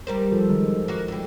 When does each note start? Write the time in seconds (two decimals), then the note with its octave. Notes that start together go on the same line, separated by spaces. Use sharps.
0.07 G3 A#4 C5
0.32 F3 A4
0.50 D#3 G#3
0.88 A#3 F#4
1.08 D3 G3